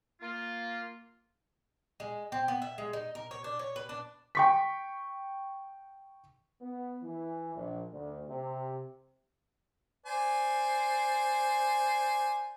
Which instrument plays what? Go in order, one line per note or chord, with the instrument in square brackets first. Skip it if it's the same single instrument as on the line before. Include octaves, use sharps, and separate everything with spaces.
[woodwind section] A#3 F4
[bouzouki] G#3
C4
B3
E5
G#3
D#4
A#4
C#5
D4
C#5
B4
D4
[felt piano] G5 C#6 B6
[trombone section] B3
E3
A#1
D2
C3
[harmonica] C5 D5 G#5